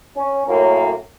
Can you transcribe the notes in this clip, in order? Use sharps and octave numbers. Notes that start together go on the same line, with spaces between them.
C#4
F#2 A2 A#3 C#4 A#4